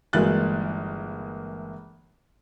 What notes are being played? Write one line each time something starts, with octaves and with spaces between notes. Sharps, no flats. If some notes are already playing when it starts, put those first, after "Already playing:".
G1 E3 G#3 A#3 F#6 A6